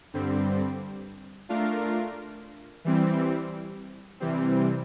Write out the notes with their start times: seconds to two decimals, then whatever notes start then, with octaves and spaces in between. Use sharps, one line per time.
0.14 G2 D3 G3 C4
1.49 A3 D4 F4 A#4 F5
2.85 E3 G3 C4
4.20 C3 E3 G3 C4